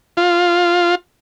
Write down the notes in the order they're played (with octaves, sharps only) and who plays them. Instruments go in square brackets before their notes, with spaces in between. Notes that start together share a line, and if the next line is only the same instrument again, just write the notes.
[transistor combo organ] F4